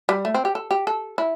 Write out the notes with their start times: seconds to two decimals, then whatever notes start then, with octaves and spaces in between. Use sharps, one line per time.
0.09 G3
0.25 A3
0.34 C4
0.45 G4
0.55 A4
0.71 G4
0.87 A4
1.18 E4